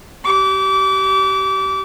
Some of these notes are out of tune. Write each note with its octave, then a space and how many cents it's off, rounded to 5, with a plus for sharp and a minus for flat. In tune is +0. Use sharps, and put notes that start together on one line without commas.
G4 -30 D6 -30